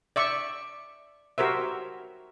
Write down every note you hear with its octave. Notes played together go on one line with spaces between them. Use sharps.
D5 E5 C#6
F#4 G4 A#4 C5 E5